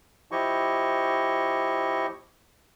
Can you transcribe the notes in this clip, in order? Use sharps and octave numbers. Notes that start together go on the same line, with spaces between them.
F3 E4 G4 D#5 C#6